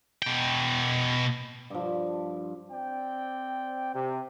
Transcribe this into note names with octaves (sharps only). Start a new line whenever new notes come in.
B2 G5
G2 F3
C4 D5 G5
C3